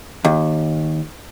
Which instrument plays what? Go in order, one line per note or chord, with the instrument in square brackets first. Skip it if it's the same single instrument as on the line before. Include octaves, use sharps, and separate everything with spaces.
[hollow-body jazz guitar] D#2